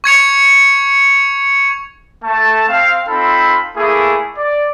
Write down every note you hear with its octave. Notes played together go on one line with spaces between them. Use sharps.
C#6 G#6 C#7 F7
A3 A5
C4 F5
C4 D#4 F4 A4 B5
A3 A#3 E4 G#4
D5